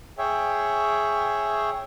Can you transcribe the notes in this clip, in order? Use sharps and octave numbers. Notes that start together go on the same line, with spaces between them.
G#4 C#5 E5 G5